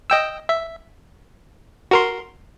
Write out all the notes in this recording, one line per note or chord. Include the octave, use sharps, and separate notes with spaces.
D#5 G5 E6
E5
F#4 A#4 C6